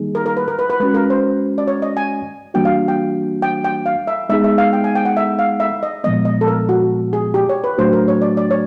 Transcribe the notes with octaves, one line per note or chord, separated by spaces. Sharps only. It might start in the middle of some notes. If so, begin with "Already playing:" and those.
Already playing: D#3 G3 A#3 D#4 G#4
A#4
A#4
B4
A#4
B4
B4
G#3 C#4 F#4 B4
A#4
C5
D5
C#5
D#5
G#5
E3 G3 A#3 D4 F#4 G5
F5
G5
G5
G5
F5
E5
G#3 B3 D#4 G#4 E5
E5
F5
G5
G#5
G5
F#5
E5
F5
E5
D#5
A#2 F3 G#3 B3 D#5
D#5
A4
A#4
F#4
G#4
G4
C#5
B4
A2 F#3 A3 D4 F#4 C5
A#4
C#5
D5
D5
C#5